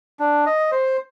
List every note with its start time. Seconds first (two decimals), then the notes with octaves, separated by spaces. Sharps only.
0.20 D4
0.46 D#5
0.72 C5